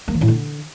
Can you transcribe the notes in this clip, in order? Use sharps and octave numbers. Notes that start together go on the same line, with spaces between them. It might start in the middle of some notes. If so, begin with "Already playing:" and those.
A#3
D#3
A2
D3